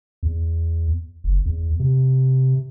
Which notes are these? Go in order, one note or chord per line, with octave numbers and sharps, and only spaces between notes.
E2
F#1
E2
C3